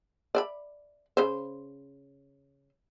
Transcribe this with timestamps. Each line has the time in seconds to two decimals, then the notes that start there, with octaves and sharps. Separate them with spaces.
0.35 D5 D#5 B5
1.17 C#3 C5